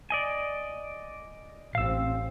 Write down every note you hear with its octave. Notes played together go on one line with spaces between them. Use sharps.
D5 D#5 G#5
A1 C4 F5 E6